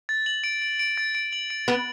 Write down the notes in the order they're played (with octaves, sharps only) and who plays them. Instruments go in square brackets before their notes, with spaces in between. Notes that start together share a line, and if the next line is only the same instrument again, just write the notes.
[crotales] A6
F#7
D7
D7
D7
A6
D7
F#7
D7
[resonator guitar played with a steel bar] B3 [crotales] D7